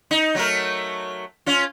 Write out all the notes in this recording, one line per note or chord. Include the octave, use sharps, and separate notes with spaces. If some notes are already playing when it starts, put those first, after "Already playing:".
D#4
F#3 A3 A#4
C#4 F4